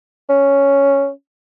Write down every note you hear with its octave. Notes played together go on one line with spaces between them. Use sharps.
C#4